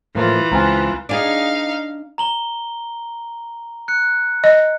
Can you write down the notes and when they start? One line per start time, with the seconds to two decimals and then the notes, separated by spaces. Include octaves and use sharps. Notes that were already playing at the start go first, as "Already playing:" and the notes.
0.15 A2 E3 F3 A#3 F4
0.52 C#2 C4 F4 G#5 A#5
1.09 D4 D#4 G#4 F5
2.18 A#5 F#7 G7
3.88 F#6 C#7
4.44 D#5